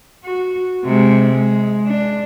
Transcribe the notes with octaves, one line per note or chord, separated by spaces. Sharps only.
F#4
C3 G#3
G#3
D4